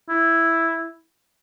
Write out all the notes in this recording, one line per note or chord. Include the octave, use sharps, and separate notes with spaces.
E4